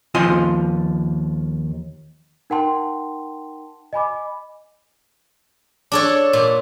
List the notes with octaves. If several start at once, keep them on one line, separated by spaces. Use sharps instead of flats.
D#2 F3 F4 D#5 G#5 C6
D#4 A#4 F#5 G5 A5 C6
D#5 G#5 B5 D6
D4 A4 C#5
A#2